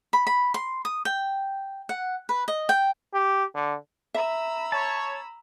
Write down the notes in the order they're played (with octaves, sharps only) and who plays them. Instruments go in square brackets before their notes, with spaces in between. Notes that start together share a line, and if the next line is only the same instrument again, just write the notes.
[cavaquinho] B5
B5
C6
D#6
G5
F#5
B4
D#5
G5
[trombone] G4
D3
[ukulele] E5 [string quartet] A#5 B5 E6
[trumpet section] C#5 [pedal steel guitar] A5